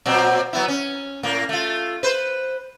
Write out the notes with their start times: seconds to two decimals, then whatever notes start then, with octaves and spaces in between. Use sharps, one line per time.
0.06 A#2 F#3 C4
0.53 F#3 B3 E4
0.68 C#4
1.23 A2 A#3
1.49 A3 F4
2.03 B4 C5